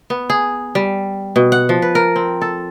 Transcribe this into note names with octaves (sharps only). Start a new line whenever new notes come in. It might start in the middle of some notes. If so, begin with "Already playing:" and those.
B3
G#4
G3
B2
F#5
F3
B4
A#4
C4
A4